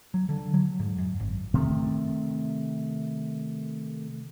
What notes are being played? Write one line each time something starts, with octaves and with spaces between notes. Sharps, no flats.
F#3
D3
F#3
G#2
F#2
G#1
C3 D#3 A3